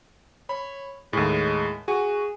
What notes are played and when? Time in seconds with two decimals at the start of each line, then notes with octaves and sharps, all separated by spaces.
0.49 C#5 B5
1.13 D#2 A2 G#3
1.88 F#4 G#4